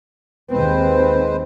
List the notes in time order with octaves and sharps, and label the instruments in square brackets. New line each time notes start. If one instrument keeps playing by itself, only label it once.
[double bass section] D#2 C4 [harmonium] G#3 B4 C5